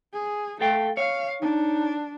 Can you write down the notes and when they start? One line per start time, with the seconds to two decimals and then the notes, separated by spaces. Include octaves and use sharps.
0.13 G#4
0.61 A3 A4 F5 G5
0.97 C#5 F5
1.42 D4 D#4